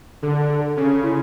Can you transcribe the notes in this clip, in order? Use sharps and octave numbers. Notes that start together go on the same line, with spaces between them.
D3 A4
A4
C#3 A4
E4